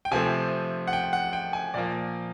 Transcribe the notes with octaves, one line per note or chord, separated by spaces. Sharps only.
G5
C3 F3 A3 C4 G#5
F#5
G5
F#5
G5
G#5
A#2 F3 A#3 D5